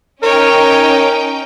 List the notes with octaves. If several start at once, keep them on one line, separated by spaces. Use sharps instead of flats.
C#4 D#4 A#4 C#5 G5